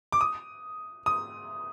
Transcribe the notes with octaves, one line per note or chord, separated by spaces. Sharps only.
D6
D#6
D#6